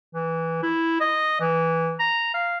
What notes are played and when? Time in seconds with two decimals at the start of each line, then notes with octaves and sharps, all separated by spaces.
0.14 E3
0.63 E4
1.01 D#5
1.41 E3
1.99 A#5
2.34 F5